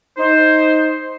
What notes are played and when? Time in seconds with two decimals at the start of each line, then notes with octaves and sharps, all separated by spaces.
0.17 D#4 C5